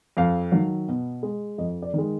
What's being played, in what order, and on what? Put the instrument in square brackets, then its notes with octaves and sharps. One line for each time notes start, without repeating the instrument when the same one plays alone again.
[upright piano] F2 F5
D#3 F#3
B2
G#3
F2 D#5
D5
D#3 G#3